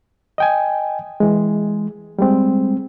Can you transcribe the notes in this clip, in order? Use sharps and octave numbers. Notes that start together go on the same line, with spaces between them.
D#5 G5 G#5
E3 G#3
G3 G#3 C4